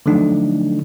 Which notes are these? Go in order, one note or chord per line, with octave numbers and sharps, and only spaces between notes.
D3 F3 F#3 A3 D4 D#4